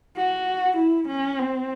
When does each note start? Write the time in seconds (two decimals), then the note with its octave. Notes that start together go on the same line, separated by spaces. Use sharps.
0.17 F#4
0.77 E4
1.08 C#4
1.39 C4